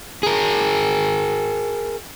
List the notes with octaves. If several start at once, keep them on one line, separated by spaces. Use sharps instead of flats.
G#4 A#4